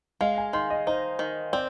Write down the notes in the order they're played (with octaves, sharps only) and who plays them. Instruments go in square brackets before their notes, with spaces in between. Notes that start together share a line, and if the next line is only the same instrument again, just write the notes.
[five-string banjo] G#3 [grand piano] F5
[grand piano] G#5
[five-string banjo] D#3 [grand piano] C6
[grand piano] D#5
[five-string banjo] D#4 [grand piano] C5
[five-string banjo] D#3
[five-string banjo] C4 [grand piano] D5